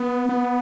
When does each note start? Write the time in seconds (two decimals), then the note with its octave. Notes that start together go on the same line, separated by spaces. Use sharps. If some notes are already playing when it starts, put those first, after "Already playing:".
Already playing: B3
0.29 B3